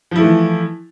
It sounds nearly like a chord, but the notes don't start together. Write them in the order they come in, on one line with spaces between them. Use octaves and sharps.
F3 E4 A3 E3